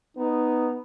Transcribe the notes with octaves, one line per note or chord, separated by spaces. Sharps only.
B3 D#4